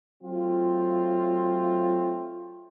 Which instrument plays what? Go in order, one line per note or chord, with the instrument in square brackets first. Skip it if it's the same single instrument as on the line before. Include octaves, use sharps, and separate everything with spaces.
[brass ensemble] F#3 A3 C4 F4